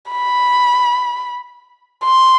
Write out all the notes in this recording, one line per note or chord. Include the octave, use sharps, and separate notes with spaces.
B5
C6